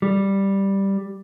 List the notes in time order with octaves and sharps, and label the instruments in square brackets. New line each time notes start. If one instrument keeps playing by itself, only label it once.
[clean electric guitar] G3